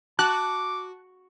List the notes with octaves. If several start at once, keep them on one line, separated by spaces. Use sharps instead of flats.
F#4 A5 D6 F#6